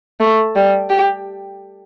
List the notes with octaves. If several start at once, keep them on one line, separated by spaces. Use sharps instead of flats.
A3
G3
G4